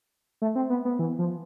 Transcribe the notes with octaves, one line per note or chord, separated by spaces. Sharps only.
A3
C4
B3
B3
E3
F3